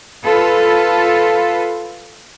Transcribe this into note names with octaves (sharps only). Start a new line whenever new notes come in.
F4 A4 B4